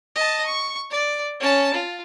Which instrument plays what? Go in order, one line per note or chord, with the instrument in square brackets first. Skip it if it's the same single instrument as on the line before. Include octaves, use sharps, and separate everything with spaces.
[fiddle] D#5 A5
C#6
D5
C#4 A5
F4